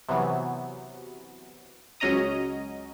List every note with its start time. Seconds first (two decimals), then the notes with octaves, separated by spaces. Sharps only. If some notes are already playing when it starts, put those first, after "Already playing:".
0.09 C3 E3 F#3 B3
2.00 C#2 F#3 C#4 D#5 A#5 D#6